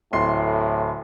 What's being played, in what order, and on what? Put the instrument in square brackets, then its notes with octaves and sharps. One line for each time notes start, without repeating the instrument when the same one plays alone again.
[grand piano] D1 C6 C7 [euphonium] A2